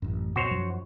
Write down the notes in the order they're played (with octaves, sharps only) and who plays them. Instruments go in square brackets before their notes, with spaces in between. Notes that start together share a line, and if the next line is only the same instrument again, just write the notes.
[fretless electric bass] A1 F#2
[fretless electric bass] F2 B2 [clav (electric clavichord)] F#4 C5 C#5
[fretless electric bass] F#2 F3 F#3